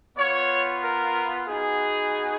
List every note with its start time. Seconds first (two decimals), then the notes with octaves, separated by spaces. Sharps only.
0.17 B3 F4 C#5
0.82 A#4
1.47 B3 D#4 F#4 G#4